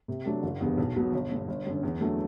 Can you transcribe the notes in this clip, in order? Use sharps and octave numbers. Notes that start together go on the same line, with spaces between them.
C3
F#3 A3 D4
F#1
E2 D3 G3 B3
B1
B2 F#3 B3
G1
G2 D3
G1
F#2 D3
E2
D3 F#3 A3